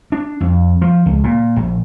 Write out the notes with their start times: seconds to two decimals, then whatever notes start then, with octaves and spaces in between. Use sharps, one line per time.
0.12 D4
0.41 F2
0.81 F3
1.06 C#2
1.24 A#2
1.56 A#1